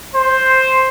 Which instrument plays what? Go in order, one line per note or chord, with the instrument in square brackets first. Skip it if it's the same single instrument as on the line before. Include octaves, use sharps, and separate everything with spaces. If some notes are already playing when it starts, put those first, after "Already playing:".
[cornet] C5